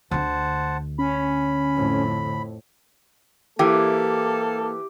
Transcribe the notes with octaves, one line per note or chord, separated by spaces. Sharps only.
D2 D3 C5 F#5 A5
C#4 B5
F2 A2
E3 A#3 G4 A4